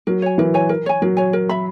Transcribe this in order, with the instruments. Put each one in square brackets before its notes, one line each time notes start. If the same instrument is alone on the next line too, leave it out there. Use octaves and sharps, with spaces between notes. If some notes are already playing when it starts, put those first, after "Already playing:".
[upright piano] F#3 [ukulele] A#4
[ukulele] C#5 G#5
[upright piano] E3 [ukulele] A#4
[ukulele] C#5 G#5
A#4
C#5 G#5
[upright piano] F#3 [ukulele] A#4
[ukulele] C#5 G#5
A#4
E5 B5